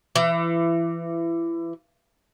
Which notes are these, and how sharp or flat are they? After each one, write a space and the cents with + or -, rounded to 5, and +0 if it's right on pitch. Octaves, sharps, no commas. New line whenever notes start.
E3 +25